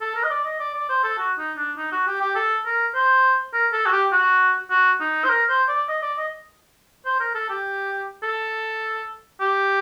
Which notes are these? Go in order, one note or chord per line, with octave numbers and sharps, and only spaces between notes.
A4
A#4
D#5
D5
D#5
D5
D5
C5
A4
F#4
D#4
D4
D#4
F#4
G4
G4
A4
A#4
C5
A#4
A4
F#4
G4
F#4
F#4
D#4
C5
A#4
C5
D5
D#5
D5
D#5
C5
A#4
A4
G4
A4
G4